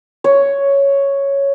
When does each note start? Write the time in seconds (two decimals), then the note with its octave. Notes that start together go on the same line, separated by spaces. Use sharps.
0.24 C#5